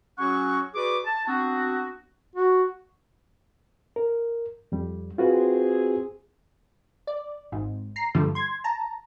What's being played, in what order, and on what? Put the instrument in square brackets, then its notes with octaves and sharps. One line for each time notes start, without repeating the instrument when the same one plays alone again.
[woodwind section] F#3 C#4 F#4 G#4 F#5 C#6
F#4 G#4 B4 D5 D6
A5
B3 C4 D4 F#4
[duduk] F#4
[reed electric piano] A#4
F2 G3
[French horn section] C4 G#4 [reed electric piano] F4 F#4 B4
[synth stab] D5
G#1 G#2
A#5 C7
G2 D3 F3 G3 A3
C6 G#6
A5 A#5